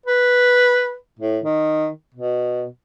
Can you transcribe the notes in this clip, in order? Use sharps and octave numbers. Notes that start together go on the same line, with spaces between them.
B4
A2
D#3
B2